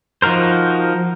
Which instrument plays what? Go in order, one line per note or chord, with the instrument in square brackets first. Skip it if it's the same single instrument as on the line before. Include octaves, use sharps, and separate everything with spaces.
[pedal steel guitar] F3 D#4 F#4 A#4 C5